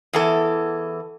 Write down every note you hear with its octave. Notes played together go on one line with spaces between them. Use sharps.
E2 E3 A4